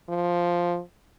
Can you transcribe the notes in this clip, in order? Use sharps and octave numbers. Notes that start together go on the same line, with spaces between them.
F3